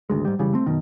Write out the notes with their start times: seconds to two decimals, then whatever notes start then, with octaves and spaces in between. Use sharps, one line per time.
0.10 G#1 D2 G#3
0.25 G#2 G3
0.39 F1 C#3 E3 G3
0.53 A3 C4
0.66 F#2 B2 D#3